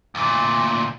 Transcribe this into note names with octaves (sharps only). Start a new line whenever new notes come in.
D2 A#2